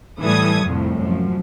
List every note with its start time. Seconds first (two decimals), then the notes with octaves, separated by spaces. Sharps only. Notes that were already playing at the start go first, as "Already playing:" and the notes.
0.22 A2 E3 G3 A4 D#6 G#6
0.65 C2 F2 A2 F3
0.99 F#2 F3